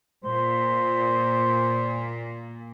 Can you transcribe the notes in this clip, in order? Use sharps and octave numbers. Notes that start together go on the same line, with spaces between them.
A#2 C5